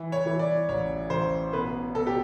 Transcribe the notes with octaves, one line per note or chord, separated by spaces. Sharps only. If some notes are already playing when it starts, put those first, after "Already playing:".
Already playing: E3
C#5
E3
D5
A1 C#5
A1 C5
B2 B4
B2 A4
G4